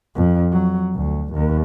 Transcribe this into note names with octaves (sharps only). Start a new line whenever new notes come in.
F2
F#3
D2
D#2